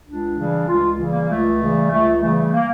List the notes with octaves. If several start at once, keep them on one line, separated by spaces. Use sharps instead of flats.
C#2 D4
C#3 E3 G3
C#2 F4
C#3 E3 G3
A#3
C#2 A3
C#3 E3 G3
C#2 A3
C#3 E3 G3 A3
A3
A#3